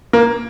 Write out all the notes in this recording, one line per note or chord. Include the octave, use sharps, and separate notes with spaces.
A#3